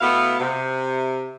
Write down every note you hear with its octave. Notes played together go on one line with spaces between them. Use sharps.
B2 A3 B3 E4 F5
C3